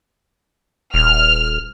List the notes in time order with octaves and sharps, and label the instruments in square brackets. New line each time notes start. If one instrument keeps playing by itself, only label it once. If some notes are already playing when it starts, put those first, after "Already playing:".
[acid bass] D#1 [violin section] F6